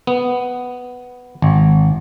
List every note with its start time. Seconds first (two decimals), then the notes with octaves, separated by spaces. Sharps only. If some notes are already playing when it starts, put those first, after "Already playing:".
0.07 B3
1.42 G#1